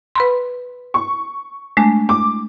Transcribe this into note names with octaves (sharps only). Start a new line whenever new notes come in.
B4 B5 C6
C#6
G#3 A3 D4
D6